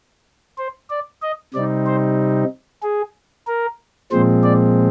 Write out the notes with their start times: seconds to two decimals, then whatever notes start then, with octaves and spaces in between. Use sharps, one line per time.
0.58 C5
0.90 D5
1.22 D#5
1.54 C3 G3 C4 D#4 D5
1.86 C5
2.83 G#4
3.47 A#4
4.12 A#2 F3 G#3 C4 C5
4.44 D5